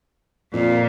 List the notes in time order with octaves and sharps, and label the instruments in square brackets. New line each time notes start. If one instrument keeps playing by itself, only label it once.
[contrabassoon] F2 [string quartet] A#2